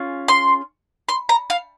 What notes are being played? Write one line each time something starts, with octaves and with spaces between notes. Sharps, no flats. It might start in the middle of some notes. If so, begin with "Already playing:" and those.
Already playing: C#4 F4 G#4
C6
C6
A#5
F5